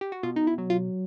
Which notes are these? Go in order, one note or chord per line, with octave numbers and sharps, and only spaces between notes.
G4
F#4
B2 F4
D#4
E4
F#3
F4